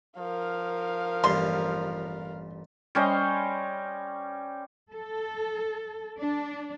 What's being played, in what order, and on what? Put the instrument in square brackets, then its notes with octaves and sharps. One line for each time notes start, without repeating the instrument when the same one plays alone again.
[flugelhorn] F3 [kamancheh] A#4 F5
[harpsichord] A1 G2 A#2 [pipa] C6
[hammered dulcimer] G3 C#4 C5 D#5
[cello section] A4
D4